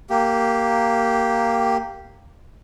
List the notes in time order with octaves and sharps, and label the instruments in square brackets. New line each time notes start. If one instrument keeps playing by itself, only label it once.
[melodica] A#3 G4